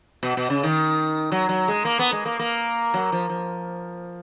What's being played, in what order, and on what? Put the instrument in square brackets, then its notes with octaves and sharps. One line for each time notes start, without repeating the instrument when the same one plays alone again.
[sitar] B2
B2
C#3
D#3
F#3
F#3
G#3
A#3
B3
G#3
A#3
A#3
F#3
F3
F3